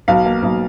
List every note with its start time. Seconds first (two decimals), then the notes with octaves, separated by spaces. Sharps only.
0.08 B1 F5
0.25 A#3
0.43 B1